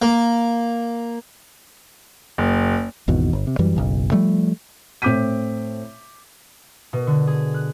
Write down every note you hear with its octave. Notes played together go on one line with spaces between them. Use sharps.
A#3
F#1
G#1 E2 B2 D#3
G1
C3
F#2 E3 G3
F#1 B1
F3 G3 A3
A2 C4 D6 G6 B6 D#7
B2
D3
G#4
F#6